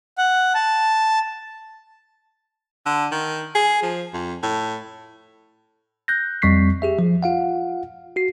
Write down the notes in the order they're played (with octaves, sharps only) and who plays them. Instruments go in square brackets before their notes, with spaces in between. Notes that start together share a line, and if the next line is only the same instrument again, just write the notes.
[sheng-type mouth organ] F#5
A5
[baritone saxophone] D3
D#3
G#4
F3
F2
A2
[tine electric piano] F#6 G6 A#6
F2 G3 C4 C#6 B6 C7
G4 G#4 E5
F3
F4 F5 F#5
F#4 C7